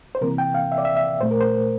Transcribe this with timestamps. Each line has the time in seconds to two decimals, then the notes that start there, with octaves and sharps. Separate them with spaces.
0.15 C5
0.21 C3 E3 A#3 A#4
0.38 G5
0.54 F5
0.72 E5
0.78 D5
0.85 E5
0.97 E5
1.20 A#2 A3 C5
1.31 A#4
1.40 C5